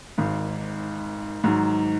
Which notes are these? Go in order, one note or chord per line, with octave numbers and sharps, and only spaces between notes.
G#1 G#2 D#3
G#2 D#3 F#3